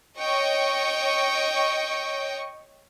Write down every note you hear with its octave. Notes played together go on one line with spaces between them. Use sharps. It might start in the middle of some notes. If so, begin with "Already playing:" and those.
C#5 D#5 G5 C#6